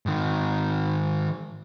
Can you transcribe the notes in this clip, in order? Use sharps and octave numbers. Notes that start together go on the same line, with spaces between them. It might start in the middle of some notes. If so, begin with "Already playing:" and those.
G#2 D#3